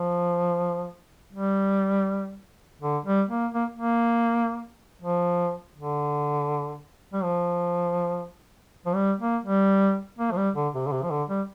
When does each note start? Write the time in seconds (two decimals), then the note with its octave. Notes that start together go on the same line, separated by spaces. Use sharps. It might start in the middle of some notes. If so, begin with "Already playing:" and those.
Already playing: F3
1.33 G3
2.81 D3
3.05 G3
3.29 A#3
3.54 A#3
3.75 A#3
5.02 F3
5.76 D3
7.13 G3
7.24 F3
8.86 F3
8.95 G3
9.20 A#3
9.44 G3
10.19 A#3
10.32 F3
10.37 G3
10.56 D3
10.74 C3
10.87 D3
10.92 C3
11.03 F3
11.10 D3
11.29 G3